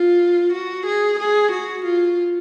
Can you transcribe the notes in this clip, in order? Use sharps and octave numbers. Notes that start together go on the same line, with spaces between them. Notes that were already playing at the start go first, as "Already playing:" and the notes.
Already playing: F4
F#4
G#4
G#4
F#4
F4